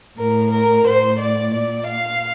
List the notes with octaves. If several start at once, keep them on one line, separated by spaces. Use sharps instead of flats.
A2 A#4
A#4
A2 C5
D5
A#2 D5
F5